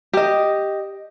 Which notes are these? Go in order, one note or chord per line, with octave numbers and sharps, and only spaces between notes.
G4 D#5